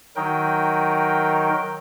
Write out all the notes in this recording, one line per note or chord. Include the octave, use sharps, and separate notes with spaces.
D#3 F#3 D#4 A#4 G5